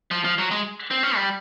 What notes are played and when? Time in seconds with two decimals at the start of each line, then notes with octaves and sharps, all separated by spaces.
0.11 F3
0.24 F3
0.38 F#3
0.51 G#3
0.91 C4
1.03 C#4
1.16 G3